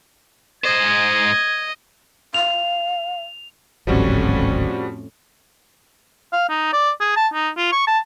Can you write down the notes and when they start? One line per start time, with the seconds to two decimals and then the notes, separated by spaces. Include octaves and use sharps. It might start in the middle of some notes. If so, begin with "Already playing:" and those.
0.64 G#2 C5 D#5 G#6
2.34 F5 F7
3.87 D1 G#1 F2 A2 F3 G3 C#4 F#4
6.33 F5
6.49 D#4
6.73 D5
7.00 G#4
7.16 A5
7.34 D#4
7.57 F4
7.72 C#6
7.87 A5